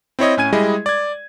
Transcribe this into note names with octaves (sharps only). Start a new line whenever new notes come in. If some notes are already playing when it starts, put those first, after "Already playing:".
C4 E4 C#5 D#5
A2 C#4 G#5 G#6 D#7
G3 G#3 E4 G#4 D#5
D5 G#6